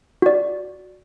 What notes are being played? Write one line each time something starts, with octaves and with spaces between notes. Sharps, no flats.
F#4 D5